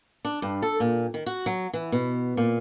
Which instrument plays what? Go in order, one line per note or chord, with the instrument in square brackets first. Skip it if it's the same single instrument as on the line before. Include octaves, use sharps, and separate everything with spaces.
[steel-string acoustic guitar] D4
G2
A4
A#2
D#3
F#4
F#3
E3
B2
A#2